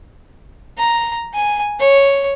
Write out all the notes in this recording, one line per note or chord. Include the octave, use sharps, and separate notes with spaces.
A#5
G#5
C#5